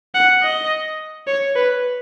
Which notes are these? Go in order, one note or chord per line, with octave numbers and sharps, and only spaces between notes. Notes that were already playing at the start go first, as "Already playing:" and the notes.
F#5
D#5
C#5
B4